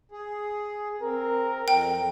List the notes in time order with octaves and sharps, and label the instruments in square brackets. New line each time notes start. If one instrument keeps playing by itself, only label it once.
[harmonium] G#4
[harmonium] C4 [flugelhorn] A#4
[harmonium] F2 [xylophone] G5